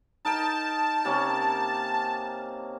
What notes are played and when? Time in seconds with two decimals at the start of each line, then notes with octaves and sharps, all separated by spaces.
0.25 D#4 A#4 G5 A5
1.05 C3 A#3 C#4